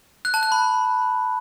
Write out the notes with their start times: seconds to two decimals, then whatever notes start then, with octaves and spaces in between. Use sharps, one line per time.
0.25 F#6
0.34 A5
0.43 F#6
0.52 B5